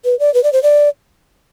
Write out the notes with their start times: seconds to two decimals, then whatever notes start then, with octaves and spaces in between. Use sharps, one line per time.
0.05 B4
0.20 D5
0.34 B4
0.44 D5
0.53 C5
0.63 D5